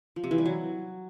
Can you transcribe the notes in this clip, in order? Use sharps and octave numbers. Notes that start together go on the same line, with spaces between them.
F3
C3
E3
G3
F#3